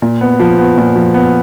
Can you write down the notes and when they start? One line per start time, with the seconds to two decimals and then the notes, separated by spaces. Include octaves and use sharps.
0.02 A#2
0.21 B3
0.40 F3
0.59 B3
0.77 A#2
0.96 F3
1.14 B3